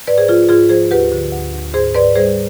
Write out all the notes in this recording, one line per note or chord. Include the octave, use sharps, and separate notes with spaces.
G#2 B4 D5
G#4 C5
F3 F4 G#4
G#2 F4 G#4
F3 G#4 C5
D2 G4 B4
D3
D2
D2
G#2 G#4 C5
G#2 B4 D5
G3 G#4 C5